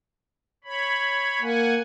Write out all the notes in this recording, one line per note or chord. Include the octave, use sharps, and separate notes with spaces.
C#5 B5
A#3 F#5 G#5